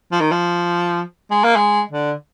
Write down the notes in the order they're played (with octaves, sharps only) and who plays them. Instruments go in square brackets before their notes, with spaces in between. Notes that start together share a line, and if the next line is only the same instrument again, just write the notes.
[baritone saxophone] F3
D#3
F3
G#3
A#3
G#3
D3